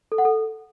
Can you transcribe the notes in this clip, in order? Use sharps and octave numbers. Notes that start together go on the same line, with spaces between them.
A4
F#5
A4